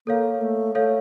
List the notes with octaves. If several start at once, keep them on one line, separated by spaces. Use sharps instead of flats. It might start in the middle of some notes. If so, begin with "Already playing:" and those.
A#3 A4 C#5 F5
A3
A3 A4 C#5 F5